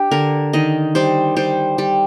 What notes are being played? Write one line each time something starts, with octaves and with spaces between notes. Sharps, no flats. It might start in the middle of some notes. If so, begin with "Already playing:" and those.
Already playing: D4 G4
D3 A#4
D#3 D#5
G3 C5
G3 C5
G3